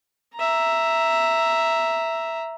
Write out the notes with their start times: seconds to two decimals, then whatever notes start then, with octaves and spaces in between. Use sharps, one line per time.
0.35 E5 A#5